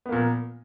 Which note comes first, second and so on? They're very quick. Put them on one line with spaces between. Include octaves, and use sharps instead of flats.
B3 A#3 A#2